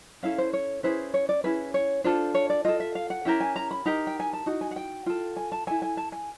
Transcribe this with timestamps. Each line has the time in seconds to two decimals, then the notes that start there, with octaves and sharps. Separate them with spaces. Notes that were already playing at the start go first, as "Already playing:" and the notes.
0.23 C#4 E4 A4 F5
0.38 C5
0.53 C#5
0.83 C#4 E4 G#4 B4 C5
1.14 C#5
1.29 D5
1.44 C#4 E4 G#4 B4
1.74 C#5
2.04 D4 F4 A4 C5
2.34 C#5
2.50 D5
2.65 F4 A4 D#5
2.80 E5
2.95 F5
3.10 F#5
3.25 C#4 E4 G4 A#4 G5
3.40 G#5
3.56 A#5
3.71 B5
3.86 D#4 G4 A#4 A#5
4.07 G5
4.20 G#5
4.33 A5
4.46 D#4 F#4
4.61 G#5
4.71 F#5
4.76 G5
5.06 F4 A4 G5
5.36 G#5
5.52 A5
5.67 E4 A4 G#5
5.82 G#5
5.97 A5
6.12 G#5